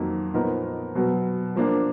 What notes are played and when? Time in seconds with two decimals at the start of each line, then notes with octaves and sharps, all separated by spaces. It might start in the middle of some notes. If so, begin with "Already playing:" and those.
Already playing: F2 D#3 F#3 A#3 D#4
0.34 A#2 F3 B3 D#4 A#4
0.95 B2 F#3 B3
1.56 F3 A#3 D4